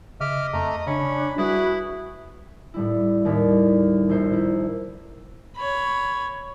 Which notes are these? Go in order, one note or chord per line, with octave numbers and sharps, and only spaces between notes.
C#3 D#5 E5 D6 F6
F2 A3 A#5
C#3 C#4 D4 B5
G3 E4 F#4 G#4 B4 F#6
A2 G3 E4
D#2 A2 G3 B6
A#1 E4 C5
E4
C#5 B5